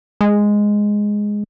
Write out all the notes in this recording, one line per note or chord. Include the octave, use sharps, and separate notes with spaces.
G#3